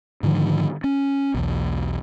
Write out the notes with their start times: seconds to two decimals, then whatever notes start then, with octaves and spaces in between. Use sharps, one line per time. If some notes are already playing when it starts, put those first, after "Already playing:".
0.23 G#2 D3 D#3 F3
0.84 C#4
1.34 B1 E2